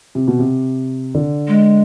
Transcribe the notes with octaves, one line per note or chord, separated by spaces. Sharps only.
C3
B2
C3
D3
G#3